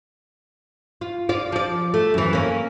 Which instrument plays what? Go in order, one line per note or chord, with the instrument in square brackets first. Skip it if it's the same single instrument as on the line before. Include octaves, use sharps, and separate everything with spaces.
[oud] F4
F4 D5
F3 D5
A3
F#2 E3
A#3 C#4